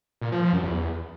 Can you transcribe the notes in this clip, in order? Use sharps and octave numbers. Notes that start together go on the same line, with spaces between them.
A#2
F3
F3
F#2
E2